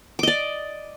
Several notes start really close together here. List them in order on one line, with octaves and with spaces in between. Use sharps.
D6 D#5 D5